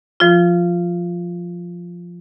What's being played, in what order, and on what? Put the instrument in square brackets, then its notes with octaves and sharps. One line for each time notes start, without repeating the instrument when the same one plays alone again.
[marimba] F3 F4